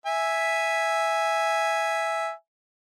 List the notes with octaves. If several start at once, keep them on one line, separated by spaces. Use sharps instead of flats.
E5 G#5